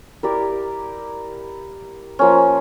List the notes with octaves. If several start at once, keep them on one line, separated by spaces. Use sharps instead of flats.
E4 G4 A#4 D5
F3 A#3 C#4